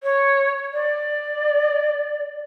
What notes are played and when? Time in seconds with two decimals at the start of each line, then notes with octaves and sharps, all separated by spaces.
0.03 C#5
0.73 D5